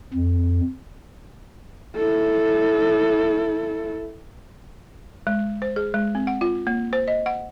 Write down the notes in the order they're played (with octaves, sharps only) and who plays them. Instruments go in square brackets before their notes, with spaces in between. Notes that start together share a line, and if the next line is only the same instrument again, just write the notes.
[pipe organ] F2
[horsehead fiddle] E4 A4
[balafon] G#3
C5
G#4
G#3
C4
F#5
F4
A#3
C5
D#5
F#5